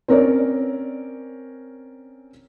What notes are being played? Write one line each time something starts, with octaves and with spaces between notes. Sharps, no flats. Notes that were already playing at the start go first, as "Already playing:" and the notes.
C4 C#4 A#4 C#5 D5